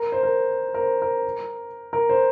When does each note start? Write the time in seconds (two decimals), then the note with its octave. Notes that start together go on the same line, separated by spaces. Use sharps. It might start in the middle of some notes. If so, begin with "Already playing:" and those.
Already playing: A#4
0.12 C5
0.23 A#4
0.74 A#4
0.79 C5
1.02 A#4
1.93 A#4
2.09 C5